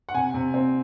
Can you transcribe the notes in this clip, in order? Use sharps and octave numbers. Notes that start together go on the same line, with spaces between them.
F#5
C3 G#5
C3
C4